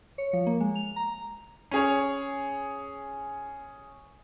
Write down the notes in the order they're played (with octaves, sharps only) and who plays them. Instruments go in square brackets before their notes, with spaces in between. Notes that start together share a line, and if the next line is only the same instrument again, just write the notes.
[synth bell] C#5
F3
A#3
G#3
F7
A#5
[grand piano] C#4 G#4 C#5